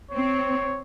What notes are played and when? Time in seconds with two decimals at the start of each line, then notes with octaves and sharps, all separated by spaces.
0.11 C4 C#5